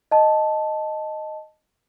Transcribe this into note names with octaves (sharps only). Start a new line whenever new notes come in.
D#5 A5